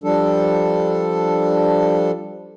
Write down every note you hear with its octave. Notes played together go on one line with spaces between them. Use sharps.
F3 G3 D4 A4